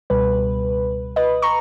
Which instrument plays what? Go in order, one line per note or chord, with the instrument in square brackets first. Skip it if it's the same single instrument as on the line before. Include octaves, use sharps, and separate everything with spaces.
[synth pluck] C#2 B2 G3 B4
B4 D#5
A#5 C#6